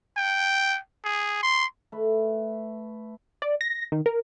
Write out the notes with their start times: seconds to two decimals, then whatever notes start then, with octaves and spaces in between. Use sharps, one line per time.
0.17 G5
1.04 G#4
1.43 C6
1.92 A3 B4
3.42 D5
3.61 A#6
3.92 D#3
4.06 A#4